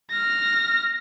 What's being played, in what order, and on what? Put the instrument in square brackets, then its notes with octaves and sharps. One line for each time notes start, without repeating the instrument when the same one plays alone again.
[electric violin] F6 A#6